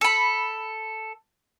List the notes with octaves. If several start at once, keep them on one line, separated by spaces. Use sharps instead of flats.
A4 B5